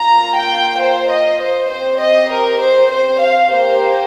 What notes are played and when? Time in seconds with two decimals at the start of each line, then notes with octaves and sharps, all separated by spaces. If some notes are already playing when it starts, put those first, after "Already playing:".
Already playing: A#3 F4 A#5
0.35 G5
0.80 C5
1.10 D#5
1.41 C5
1.70 C4 G4 C5
2.00 D#5
2.31 A#4
2.61 C5
2.91 C5
3.20 F5
3.51 A#3 G4 C5